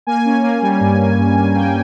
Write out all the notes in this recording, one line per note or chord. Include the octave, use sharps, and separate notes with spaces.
A#3 G#5
C#4
A#3
G3
G2
G3
G2
A#3
A#3 G5